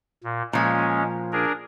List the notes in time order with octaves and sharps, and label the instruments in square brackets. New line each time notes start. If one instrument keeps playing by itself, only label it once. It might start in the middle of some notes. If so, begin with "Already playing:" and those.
[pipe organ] A#2
[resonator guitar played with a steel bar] A#2 F3 [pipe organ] G#3 C#4
[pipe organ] D4 G#4 A#4